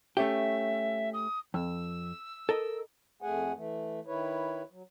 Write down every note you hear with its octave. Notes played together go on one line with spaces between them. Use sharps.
A3 C#4 G4 E5
D#6
F2 E6
A4 A#4 D#5
F2 A3 G#4 F#5 G#5
E3 A3
D#3 E4 B4 C#5
F#3